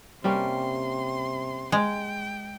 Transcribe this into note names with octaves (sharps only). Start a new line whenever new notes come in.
C3 G3 A#3 C#4 C6
G#3 G5